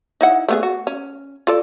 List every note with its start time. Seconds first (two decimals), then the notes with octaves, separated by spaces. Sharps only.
0.21 D#4 E4 F#5
0.48 A3 B3 G#4
0.63 F#4
0.87 C#4
1.47 F4 A4 D5